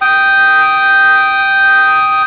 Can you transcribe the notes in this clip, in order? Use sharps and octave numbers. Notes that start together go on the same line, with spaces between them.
G5 D#6